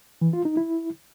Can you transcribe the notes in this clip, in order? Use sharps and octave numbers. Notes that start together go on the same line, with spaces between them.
E3
F4
D#4
E4